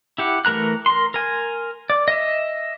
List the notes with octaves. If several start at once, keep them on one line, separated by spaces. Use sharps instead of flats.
E4 G4 F#5
E3 A3 A#4 A#5 F#6
A#4 C6
A#4 G#5
D5
D#5 E5